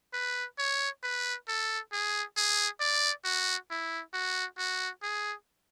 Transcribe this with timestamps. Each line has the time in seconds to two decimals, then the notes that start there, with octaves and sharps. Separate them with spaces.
0.14 B4
0.58 C#5
1.03 B4
1.48 A4
1.92 G#4
2.37 G#4
2.80 D5
3.25 F#4
3.70 E4
4.14 F#4
4.58 F#4
5.03 G#4